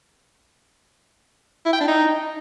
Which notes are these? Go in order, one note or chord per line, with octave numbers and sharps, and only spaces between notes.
E4
G5
D4
D#4